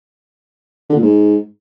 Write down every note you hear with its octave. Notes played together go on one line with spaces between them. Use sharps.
D3
A#2
G#2